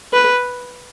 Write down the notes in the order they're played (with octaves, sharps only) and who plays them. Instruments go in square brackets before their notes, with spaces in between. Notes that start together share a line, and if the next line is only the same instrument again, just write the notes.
[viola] B4